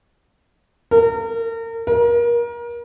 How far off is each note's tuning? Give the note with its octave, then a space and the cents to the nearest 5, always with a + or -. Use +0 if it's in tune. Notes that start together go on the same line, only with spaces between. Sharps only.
A#4 -35
A#4 +30